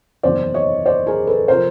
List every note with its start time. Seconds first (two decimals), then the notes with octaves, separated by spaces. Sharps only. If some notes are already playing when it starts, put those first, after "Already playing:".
0.23 F#1 E2 C3 D#3 C5 D5
0.54 C#5 D#5
0.86 C5 D5
1.07 G#4 A#4
1.27 A4 B4
1.48 C3 F3 A#4 C5